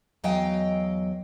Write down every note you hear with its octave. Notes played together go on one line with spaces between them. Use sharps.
E2 F#3 D#5 F5 G5